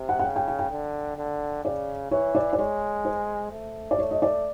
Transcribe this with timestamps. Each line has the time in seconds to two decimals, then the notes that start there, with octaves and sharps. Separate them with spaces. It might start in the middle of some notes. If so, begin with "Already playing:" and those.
Already playing: C3
0.09 F#5
0.19 F#5
0.24 C#3 G5
0.36 G5
0.48 G5
0.59 G5
0.71 D3
1.17 D3
1.65 C#3 D5
2.11 E3 C#5
2.35 D5
2.53 D5
2.58 G#3 C#5
3.05 C5
3.52 A3
3.91 D5
3.98 A3 C#5
4.11 D#5
4.22 D5